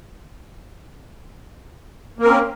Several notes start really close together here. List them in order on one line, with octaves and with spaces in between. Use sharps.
A#3 A#4 C4 C#4